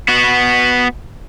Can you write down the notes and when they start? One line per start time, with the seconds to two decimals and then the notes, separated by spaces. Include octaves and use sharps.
0.08 B3 F#4